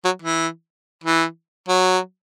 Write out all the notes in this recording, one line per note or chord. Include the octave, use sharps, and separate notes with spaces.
F#3
E3
E3
F#3